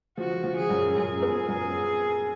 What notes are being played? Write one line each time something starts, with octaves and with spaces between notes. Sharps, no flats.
F3 F#4
F3
G#4
F#2
F#2 G#4
B3
F#2